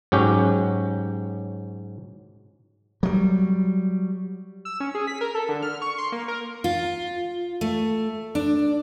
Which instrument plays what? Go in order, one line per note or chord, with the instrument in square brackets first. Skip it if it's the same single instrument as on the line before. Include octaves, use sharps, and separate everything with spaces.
[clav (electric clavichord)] G#2 F#3 C#4 G4
[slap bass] F#3 G3
[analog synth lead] E6
C#4
G#4
B6
A#4
A4
D3
F6
C#6
C6
A#3
A#4
[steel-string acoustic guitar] F4
A3
D4